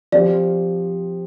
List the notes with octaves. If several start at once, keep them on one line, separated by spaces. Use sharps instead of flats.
F3 C4 G4 C5 D5